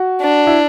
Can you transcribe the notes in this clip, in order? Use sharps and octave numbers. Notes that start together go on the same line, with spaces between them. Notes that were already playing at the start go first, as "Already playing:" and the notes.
Already playing: F#4
D4
E4